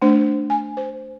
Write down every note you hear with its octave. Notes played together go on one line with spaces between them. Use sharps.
A3 D4 C5
G#5
C5